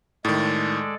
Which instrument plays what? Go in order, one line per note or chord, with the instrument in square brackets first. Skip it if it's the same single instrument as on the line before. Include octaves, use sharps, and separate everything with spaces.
[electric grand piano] A2 D#3 [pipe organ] G#3 A4 D5